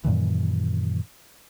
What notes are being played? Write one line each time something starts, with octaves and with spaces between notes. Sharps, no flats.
F#2 A#2 D#3 E3